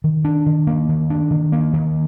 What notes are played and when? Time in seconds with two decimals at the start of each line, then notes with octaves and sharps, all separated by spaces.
0.04 D#3
0.25 D4
0.46 D#3
0.67 A#3
0.89 D#3
1.10 D4
1.31 D#3
1.52 A#3
1.73 D#3